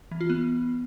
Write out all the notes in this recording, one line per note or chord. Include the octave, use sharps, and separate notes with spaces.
E3
F4
B3